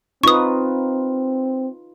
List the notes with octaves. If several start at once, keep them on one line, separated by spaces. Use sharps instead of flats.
C4 D#4 F4 B4 C#6 D#6